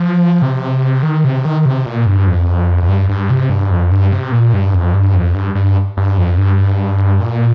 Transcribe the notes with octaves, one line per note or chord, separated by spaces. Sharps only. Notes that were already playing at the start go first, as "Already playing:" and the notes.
Already playing: F3
C3
D#3
C3
D#3
C3
A#2
G2
F2
F2
G2
G2
C3
G2
F2
G2
C3
A#2
G2
F2
G2
F2
G2
G2
G2
F2
G2
A#2